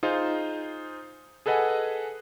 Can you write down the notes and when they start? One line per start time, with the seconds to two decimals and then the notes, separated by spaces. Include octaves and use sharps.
0.03 D#4 F4 G#4 C5
1.46 G#4 A4 B4 D#5 F#5 G#5